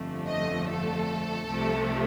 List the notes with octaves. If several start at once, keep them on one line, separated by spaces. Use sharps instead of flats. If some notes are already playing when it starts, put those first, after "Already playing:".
Already playing: G1 F2 D3 F3 A3
D#5
A4
C2 C3 F3 A3